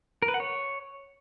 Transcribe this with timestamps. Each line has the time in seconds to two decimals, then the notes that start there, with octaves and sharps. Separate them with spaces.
0.22 A#4
0.28 B4
0.34 F#5
0.40 C#5